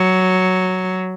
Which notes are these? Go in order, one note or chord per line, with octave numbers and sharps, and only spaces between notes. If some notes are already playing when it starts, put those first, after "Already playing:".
Already playing: F#3